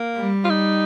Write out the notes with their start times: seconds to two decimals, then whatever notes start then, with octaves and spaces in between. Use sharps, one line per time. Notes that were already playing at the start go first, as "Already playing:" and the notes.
Already playing: A#3
0.17 G3
0.44 F4
0.50 D#4